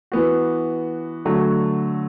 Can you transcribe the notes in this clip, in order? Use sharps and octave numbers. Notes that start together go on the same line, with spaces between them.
E3 B3 F#4
D3 F#3 A3 F#4